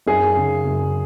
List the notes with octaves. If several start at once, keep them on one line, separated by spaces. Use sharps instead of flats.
F#2 G#4
C#3
F#2